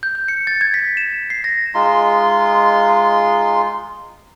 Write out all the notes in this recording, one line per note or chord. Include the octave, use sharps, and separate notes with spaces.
G6
G6
C#7
A6
G#6
B6
E7
C7
A#6
G#3 D#4 F4 C6